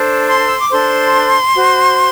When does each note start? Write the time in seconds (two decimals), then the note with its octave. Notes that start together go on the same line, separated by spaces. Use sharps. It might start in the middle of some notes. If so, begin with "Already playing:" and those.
Already playing: D4 A4 C5
0.28 C6
0.47 E6
0.59 D6
0.70 D4 A4 C5 C6
1.54 F#4 C5